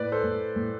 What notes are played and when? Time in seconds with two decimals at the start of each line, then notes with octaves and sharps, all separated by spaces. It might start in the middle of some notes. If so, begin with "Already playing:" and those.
Already playing: A2 B4 D5
0.12 A4 C5
0.24 A2
0.56 A2